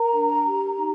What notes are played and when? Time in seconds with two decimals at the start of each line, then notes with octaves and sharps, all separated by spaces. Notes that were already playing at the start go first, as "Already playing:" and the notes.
Already playing: A#4 A#5
0.13 D4
0.45 G4
0.77 D#4